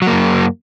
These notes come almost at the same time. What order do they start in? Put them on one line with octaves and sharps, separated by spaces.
F#3 A#3 F#2